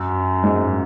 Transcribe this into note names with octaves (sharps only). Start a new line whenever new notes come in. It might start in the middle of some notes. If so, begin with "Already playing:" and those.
Already playing: F#2
G#2